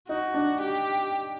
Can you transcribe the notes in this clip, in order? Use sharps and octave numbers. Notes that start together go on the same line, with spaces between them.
D#4 F#4
D4
G4